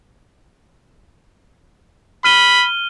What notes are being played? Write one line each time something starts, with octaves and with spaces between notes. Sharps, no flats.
B5 F6 D#7 G7